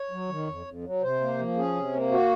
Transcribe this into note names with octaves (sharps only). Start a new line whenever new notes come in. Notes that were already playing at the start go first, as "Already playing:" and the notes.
Already playing: C#5
F#3
D#3
F2
F2
F#3
C3 C5
A#3
F3
C#4 G#4
C3
A#3
F#4